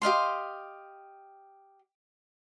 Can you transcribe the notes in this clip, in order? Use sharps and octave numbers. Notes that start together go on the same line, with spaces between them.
G4 D#5 F5 C6